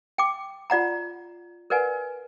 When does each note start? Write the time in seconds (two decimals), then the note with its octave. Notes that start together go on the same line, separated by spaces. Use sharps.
0.18 G5 D6
0.70 F4 D5 F#5 A#5
1.70 A#4 B4 D5 F#5 G#5